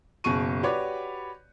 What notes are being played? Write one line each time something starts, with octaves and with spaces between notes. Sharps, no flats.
F#1 B2 G#4 C#6 D#7
F#4 G4 B4 C#5 D5 D6